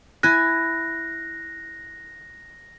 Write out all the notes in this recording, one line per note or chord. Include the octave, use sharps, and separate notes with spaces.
E4 G#5 F#6 A#6